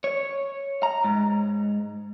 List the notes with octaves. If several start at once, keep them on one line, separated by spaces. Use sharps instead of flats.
C#5
A#5
G#2